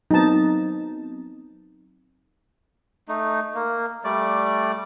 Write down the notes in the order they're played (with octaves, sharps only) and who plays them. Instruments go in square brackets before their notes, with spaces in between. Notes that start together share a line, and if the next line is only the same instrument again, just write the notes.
[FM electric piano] F#3 B3 C4 [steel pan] D#4 A5
[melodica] A3 D#4
A#3
G3 A3 D5